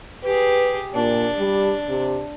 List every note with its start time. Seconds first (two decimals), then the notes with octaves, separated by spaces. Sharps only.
0.24 G4 G#4 B4
0.95 A#2 D4
1.38 G3
1.89 C3